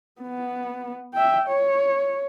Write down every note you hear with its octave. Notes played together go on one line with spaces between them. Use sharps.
B3
E5 G5
C#5